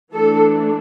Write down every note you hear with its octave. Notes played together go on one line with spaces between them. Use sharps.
E3 A3 D4 A4